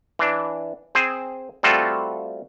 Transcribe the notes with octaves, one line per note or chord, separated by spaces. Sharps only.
E3 D4
C4 G#4 C5
G3 A3 C4 F4 F#4 A4